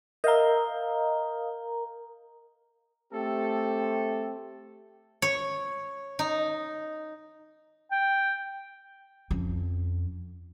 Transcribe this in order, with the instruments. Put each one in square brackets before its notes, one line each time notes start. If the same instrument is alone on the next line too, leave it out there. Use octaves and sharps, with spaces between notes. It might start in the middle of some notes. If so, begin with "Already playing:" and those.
[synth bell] A#4 A#5 [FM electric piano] D#5 F5
[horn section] A3 C4 G4 A4
[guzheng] C#5
D#4
[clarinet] G5
[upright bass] F2 C#4